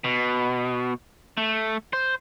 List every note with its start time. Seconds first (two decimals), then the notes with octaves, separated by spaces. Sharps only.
0.04 B2
1.37 A3
1.93 C5